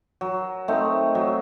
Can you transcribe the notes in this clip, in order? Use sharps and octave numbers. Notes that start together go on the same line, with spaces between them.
F#3
A3 C4 D#4
F#3